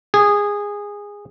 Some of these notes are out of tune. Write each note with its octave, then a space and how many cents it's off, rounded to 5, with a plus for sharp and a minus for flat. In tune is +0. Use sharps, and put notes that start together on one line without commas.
G#4 -15